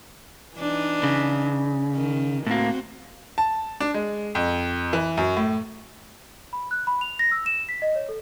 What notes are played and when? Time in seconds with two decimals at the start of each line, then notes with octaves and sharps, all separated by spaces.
0.56 E3 D4 D#4
1.03 C#3
1.94 D#3
2.47 A2 A#3 C4 F#4
3.38 A5
3.80 D4
3.94 G#3
4.35 F2
4.93 E3
5.17 F#2
5.37 A2
6.53 B5
6.71 F#6
6.87 B5
7.01 F7
7.19 A#6
7.32 E6
7.46 E7
7.69 B6
7.82 D#5
7.96 C#5
8.09 A4